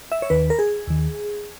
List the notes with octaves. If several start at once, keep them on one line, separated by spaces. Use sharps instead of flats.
E5
C#5
D#2 D#3 B4
A#4
G#4
D#2 D#3